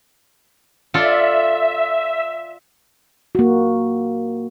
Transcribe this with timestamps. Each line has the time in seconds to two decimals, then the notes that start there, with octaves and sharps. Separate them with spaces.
0.94 F4 A4 D5 E5
3.35 A#3 F#4